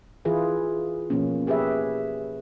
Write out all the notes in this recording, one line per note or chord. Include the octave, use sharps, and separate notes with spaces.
E3 E4 F4 G#4 B4
B2 F3 A#3 C#4
G4 G#4 B4 C#5 E5